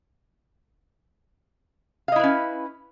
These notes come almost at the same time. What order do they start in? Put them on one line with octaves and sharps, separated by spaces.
F5 D#5 E4 B4 C#4